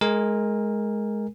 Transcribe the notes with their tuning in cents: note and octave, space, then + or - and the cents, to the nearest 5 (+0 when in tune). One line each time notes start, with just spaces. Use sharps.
G#3 +20 A#4 +0 G#5 -25